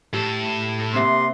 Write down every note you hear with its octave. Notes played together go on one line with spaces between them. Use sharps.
A2 G4 A4
C3 A#3 C4 E5 C6